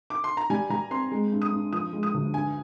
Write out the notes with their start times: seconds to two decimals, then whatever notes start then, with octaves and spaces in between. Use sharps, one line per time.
0.10 D6
0.24 C6
0.37 A#5
0.50 G3 G#5
0.70 G3 A#5
0.91 C4 C6
1.12 G#3
1.32 G2
1.42 D#6
1.52 G2
1.73 F3 D#6
1.93 G#3
2.03 D#6
2.14 D2
2.34 G2 G#5